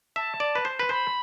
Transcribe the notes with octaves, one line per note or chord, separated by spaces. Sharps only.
E5 A5
D5
B4
C5
B4
C5 B5